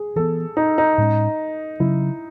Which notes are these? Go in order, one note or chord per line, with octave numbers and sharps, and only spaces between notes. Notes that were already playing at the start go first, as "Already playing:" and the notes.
Already playing: G#4
E3 B3 A4
D#4
D#4
A2 G#3 C#4
C#3 F#3 C#4 E4